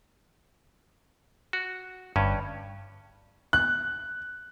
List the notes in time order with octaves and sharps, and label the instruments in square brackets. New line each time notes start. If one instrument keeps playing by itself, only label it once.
[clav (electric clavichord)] F#4
[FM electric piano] G1 [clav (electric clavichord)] G2 C#4
[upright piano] F#6